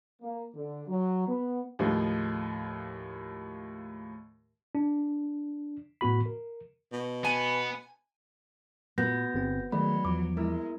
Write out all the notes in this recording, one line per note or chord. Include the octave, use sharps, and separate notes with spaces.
A#3
D3
F#3
B3
D#2 A2 F3 G#3
D4
A2 B3 F#4 B5
A#4
B2
B3 G#5
A#2 B3 F#4 G6 A#6
G1 C4
D#3 F#3 G#3 A3 D5 B5
E2 F3 D6
G#3 A#3 E4 A#4